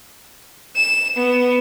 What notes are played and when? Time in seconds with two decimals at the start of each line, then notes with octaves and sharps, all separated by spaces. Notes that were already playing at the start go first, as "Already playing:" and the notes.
0.77 E7
1.17 B3